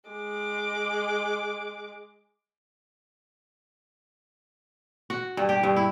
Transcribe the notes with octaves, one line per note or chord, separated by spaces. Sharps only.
G#3 D6
F#4
G2
G4
G2
E4